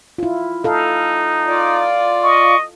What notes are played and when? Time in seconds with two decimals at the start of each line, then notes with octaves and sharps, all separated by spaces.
0.18 E4 F4
0.64 D#4 A4 F5
1.47 F4 D5
2.23 D#5 C#6